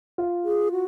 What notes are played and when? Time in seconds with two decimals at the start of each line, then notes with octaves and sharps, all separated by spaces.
0.18 F4
0.45 G#4
0.72 F#4